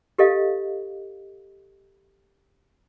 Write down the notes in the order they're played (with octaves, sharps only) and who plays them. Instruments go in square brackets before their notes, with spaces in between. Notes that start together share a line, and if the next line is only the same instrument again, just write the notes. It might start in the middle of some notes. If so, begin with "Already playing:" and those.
[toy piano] G4 A4 D#5 F5